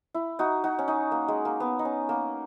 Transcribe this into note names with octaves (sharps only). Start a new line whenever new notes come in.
E4
D#4 F#4
D#4 F#4
C#4
D#4
A#3
G#3
A#3
B3
D#4
C#4
A#3